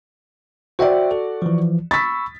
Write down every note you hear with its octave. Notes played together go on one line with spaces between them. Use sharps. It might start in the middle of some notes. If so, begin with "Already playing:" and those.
F#4 C5 D5 E5 G5
A4
E3 F3
B5 C#6 E6 A6 B6